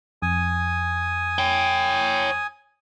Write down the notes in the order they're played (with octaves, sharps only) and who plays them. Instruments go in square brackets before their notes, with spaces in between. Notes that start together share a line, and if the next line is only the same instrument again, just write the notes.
[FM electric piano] F2 [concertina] G#5 D#6
[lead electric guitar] C#5 G5